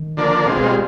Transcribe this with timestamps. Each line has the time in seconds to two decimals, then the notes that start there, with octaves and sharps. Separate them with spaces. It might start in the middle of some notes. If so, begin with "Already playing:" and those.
Already playing: D#3
0.17 D3 F3 A#3 D4
0.46 B2 G#3 C4 F4
0.56 E3
0.66 G3